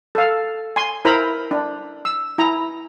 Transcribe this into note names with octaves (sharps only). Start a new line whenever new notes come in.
A4 F5
G#5 C6
E4 A#4 C5 A#5 B5
D4
E6
E4 A#5